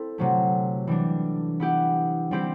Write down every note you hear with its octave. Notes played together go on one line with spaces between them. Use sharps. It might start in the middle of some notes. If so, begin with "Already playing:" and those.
Already playing: C4 E4 A4
C3 F#3 A3
E3 G3 D4
B3 E4 G4
G3 C4 E4 G4 C5